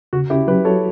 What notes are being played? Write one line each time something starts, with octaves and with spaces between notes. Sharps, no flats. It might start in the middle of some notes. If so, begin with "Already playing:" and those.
C#3 F#4
C#4 E4 G4
F#3 G4 B4
F#4 A4 C#5